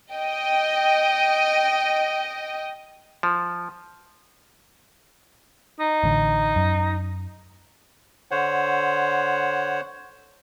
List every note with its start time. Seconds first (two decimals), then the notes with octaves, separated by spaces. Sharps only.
0.14 D#5 G5
3.23 F3
5.80 D#4
6.04 A1 D3
6.56 F#2
8.31 D3 C5 C#5 F#5